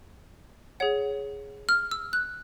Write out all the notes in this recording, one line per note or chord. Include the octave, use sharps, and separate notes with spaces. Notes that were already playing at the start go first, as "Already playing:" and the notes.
G#4 C#5 F#5
F6
E6
F#6